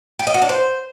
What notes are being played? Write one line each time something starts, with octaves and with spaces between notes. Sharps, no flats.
G4
D#5
F#4
D4
C5